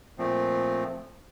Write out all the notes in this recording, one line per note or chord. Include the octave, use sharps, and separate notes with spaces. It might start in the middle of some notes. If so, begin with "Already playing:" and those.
A#2 F3 A3 C4